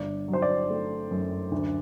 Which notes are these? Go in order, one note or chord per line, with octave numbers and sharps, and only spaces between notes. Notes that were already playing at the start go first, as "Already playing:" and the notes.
Already playing: G1 D5
F#3
C5
D5
A3
F#2
D2